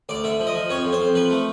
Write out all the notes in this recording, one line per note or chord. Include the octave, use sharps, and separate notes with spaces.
D2 D5
D3 E5
F3
D#5
F3
F2 C#5
F2
C5
F2
F3 B4
A3